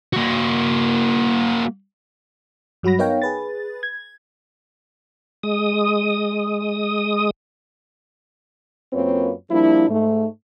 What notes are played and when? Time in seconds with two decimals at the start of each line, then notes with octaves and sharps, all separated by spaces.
0.13 A#3 F#4
2.83 G2 F#3 F#4 B5 A#6
2.98 B3 D#4 A#4 C#5 F5 G5
3.22 G#4 B4 A6
3.83 G#6
5.43 G#3 D#6
8.93 F#2 A#3 C4 F4 B4 C#5
9.50 F3 G3 A#3 D4 E4
9.89 G#2 A3